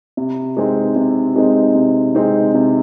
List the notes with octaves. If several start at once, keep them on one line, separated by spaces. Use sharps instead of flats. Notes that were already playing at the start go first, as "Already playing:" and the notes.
C3
G#3 C4 D#4
C3
G#3 C4 D#4
C3
G#3 C4 D#4
C3